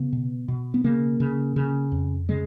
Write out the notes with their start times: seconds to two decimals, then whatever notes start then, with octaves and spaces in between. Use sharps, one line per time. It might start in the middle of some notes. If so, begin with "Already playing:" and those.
Already playing: C#3 B3
0.13 B2
0.48 B2
0.74 B3
0.84 C#3 A#3
1.20 C#3
1.56 C#3
1.92 F2
2.29 C#3 G#3